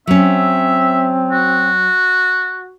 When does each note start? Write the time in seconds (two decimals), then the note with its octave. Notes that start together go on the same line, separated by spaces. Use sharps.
0.07 F#3 C4 C#4 E5
1.32 F#4